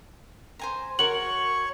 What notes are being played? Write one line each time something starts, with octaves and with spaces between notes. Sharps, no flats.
C5 G#5 A#5
F#4 A#4 C#5 C#6 F#7